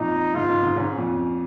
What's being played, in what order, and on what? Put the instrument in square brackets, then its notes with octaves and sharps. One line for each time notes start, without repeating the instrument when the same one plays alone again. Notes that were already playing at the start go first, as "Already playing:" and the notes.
Already playing: [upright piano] F2 A#2 [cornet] D#4
[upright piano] G#2 C#3 [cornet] F4
[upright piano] G#2 C#3
G#2 C#3
[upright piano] G#2 C#3 [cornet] C#4
[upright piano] F2 A#2